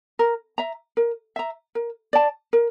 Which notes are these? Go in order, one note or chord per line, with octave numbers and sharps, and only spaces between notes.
A#4
E5 A#5
A#4
E5 A#5
A#4
D5 A5
A#4